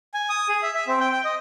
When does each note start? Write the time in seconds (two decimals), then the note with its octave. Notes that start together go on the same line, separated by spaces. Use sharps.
0.14 G#5
0.29 D#6
0.49 G#4
0.63 E5
0.75 E5
0.87 C4
1.00 G5
1.12 G5
1.25 D#5